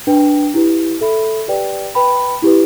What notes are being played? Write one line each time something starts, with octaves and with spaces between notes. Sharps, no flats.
D4 B4 G5
E4 G4 B4
A4 E5 B5
G4 B4 D5 G5
B4 G5 B5
E4 G4 B4